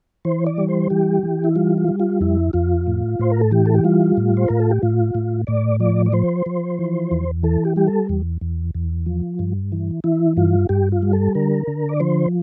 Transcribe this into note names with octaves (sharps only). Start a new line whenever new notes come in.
E3 C5
D5
G3
C5
E3 G4
E3
E4
G3 F4
F4
G3
F4
F2 E4
F2 F4
A2
A2 C5
A#4
A4
E3 G4
A4
G4
G3 F4
A2
C5
A2 A#4
A4
G4
A2 F4
A2
A2 D5
F3 D5
D5
F3 C5
F3
E3
E2
E3 A4
G4
G3 G4
A4
E2
E2
E2
F3
G2
E3
E3 E4
G2 F4
G2 G4
F4
G3
A4
D3 A#4
D3
D5
F3 C5